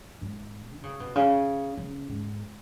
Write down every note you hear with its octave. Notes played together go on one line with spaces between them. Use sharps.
G#2
D#3
C#3
B2
C#3
C#3
G#2